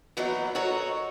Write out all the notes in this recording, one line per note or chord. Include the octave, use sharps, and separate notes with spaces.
E3 F#3 A#3 B3 D#4
F#4 A4 A#4 C#5 D#5